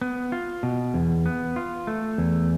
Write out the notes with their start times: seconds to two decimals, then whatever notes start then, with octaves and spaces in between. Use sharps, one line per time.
0.01 B3
0.32 F4
0.63 B2
0.94 E2
1.26 B3
1.56 F4
1.87 A3
2.18 E2